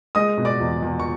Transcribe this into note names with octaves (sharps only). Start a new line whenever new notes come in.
G#3 D#5 D#6
B2
D5 D6
E2
E2
C#6